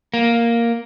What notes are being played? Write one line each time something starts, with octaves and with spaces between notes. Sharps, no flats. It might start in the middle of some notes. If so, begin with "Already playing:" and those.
A#3